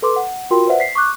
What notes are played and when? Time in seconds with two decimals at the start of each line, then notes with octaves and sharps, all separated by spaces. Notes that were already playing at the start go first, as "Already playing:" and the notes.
0.02 A4 B4 C6 D6
0.16 F#5
0.51 F4 F#4 A#4 G5 C6
0.67 B4 C5 D5 E5 F#5
0.80 B6 C7
0.95 C#6 D6 F#6